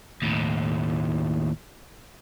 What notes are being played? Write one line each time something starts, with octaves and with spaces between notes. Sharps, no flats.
D#2 A2